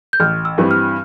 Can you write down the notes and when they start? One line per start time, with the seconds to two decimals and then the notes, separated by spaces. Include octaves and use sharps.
0.13 G6
0.20 A1 F6
0.45 E6
0.58 G2 E3 G3 C4
0.71 F6